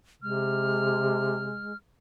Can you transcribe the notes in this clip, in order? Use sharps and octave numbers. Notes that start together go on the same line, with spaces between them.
C3 G#3 F6